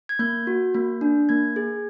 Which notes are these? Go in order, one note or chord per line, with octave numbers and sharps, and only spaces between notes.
G#6
A#3 G6
F#4
A#3
D4
A#3 G#6
G#4